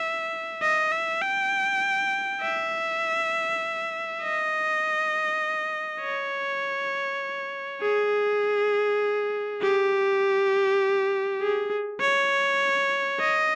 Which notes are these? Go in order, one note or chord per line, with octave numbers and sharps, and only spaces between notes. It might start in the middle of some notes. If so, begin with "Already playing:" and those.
Already playing: E5
D#5
E5
G5
E5
D#5
C#5
G#4
G4
G#4
C#5
D#5